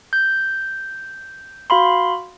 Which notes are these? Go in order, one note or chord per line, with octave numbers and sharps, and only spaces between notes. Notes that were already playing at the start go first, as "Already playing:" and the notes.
G6
F#4 F5 B5 C6